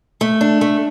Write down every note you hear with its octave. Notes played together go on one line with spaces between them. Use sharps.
A3
D4
A3